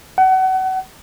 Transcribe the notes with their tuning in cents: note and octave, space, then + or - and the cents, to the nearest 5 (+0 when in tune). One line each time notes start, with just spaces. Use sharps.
F#5 +30